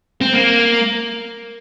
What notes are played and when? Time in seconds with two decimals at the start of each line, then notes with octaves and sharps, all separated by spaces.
0.21 C4
0.33 A#3